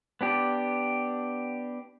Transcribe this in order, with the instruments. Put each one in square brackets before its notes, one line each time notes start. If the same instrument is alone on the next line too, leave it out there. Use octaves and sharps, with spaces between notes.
[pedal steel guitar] B3 D4 G4